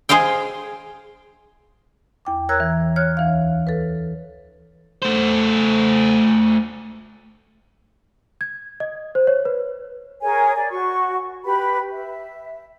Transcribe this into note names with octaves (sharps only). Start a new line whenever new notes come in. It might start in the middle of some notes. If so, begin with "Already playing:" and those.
G#4 C5 D#5 F5 G5
E2 G5 D6
A#4 C#5 A#5 E6 F#6 G#6
E3
C#5 F6 F#6 G#6
D2 E3 F5
A4 B4
A3 C5
G#6
D#5
C5
C#5
B4
G#4 A#4 C#5 G#5
D5 G#5
F#4 C#6
G4 B4 B5
E5